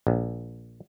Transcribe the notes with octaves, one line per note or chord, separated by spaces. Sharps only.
A#1